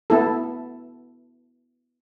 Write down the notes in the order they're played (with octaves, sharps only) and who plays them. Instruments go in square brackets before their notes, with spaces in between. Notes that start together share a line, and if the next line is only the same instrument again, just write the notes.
[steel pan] B3 E4 A4